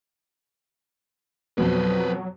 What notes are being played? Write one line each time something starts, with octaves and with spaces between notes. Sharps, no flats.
F2 B2 F#3 B4 C5